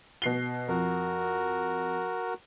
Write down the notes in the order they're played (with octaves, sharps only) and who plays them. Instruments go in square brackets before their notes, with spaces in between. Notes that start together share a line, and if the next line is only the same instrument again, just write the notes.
[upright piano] B2 C7 G7
[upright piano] F2 [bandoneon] F#4 A#4